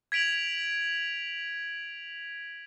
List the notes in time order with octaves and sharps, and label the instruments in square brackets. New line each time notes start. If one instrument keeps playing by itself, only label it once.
[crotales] G#6 B6 D7 F7 F#7